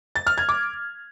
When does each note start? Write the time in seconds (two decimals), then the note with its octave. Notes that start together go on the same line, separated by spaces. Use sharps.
0.16 A6
0.27 F6
0.38 G#6
0.49 D6